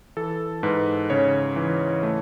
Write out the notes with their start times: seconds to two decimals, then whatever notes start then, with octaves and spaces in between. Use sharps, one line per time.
0.17 E3 A4
0.63 G#2 B4
1.10 C#3 C#5
1.56 E3
2.03 A3